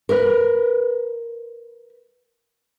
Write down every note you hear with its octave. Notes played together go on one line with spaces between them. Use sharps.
A#4 B4